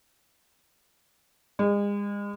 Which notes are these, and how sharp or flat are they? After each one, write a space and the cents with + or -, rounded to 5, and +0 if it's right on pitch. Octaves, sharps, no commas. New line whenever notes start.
G#3 -35